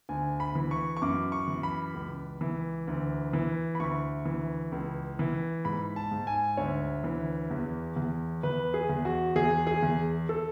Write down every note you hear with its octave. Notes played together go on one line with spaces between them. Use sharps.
D2 G#5
B5
E3
C#6
C#6
F#2 D6
C#6
E3
B5
C#2
E3
D2
E3
B5
D2 C#6
E3
C#2
E3
G#2 B5
A5
G#2
G#5
D2 C#5
E3
E2
E2
E2 B4
G#4
E2
F#4
E2 G#4
G#4
E2
A4